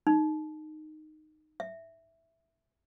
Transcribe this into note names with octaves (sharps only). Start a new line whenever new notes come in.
D#4
E5